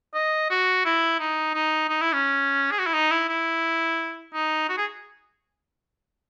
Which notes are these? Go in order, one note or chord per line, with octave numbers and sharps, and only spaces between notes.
D#5
F#4
E4
D#4
D#4
D#4
E4
C#4
G#4
F#4
E4
D#4
E4
E4
D#4
F#4
G#4